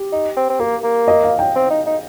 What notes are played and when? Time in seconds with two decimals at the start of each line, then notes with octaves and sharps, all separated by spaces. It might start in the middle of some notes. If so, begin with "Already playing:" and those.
Already playing: G4
0.12 D#4
0.37 C4
0.50 C4
0.59 A#3 A#4
0.84 A#3
1.08 D#5
1.23 F5
1.39 G5
1.56 C4
1.70 D#4
1.86 D#4